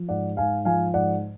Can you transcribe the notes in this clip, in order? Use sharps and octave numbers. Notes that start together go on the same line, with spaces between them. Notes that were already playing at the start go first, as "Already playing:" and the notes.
Already playing: F3
G#2 D5 F#5
G#2 F5 G#5
F3 F5 G#5
G#2 D5 F#5